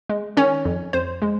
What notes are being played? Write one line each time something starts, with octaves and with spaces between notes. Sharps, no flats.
G#3
D#3 C#4 C#5
F2
F2 C5
G#3